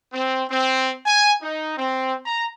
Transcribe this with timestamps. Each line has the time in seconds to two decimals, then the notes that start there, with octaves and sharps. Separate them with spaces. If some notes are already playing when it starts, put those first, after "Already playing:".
0.12 C4
0.50 C4
1.06 G#5
1.42 D#4
1.77 C4
2.26 A#5